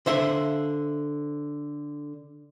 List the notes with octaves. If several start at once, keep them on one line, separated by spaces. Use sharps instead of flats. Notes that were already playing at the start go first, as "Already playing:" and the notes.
D3 C5 E5 F5 C6